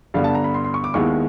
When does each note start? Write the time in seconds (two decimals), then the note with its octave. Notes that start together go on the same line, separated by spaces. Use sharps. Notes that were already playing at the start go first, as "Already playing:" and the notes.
0.14 G2 D3 G3 B3 F5
0.24 A5
0.35 A#5
0.44 B5
0.54 C6
0.64 C6
0.74 C#6
0.84 D6
0.94 D#2 D#3 G#3 B3 E4 C#6